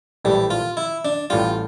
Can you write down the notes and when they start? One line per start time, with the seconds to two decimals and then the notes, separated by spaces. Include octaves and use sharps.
0.24 A#1 A2 E3 G3
0.50 F4
0.77 E4
1.05 D4
1.30 A1 A2 G3 F4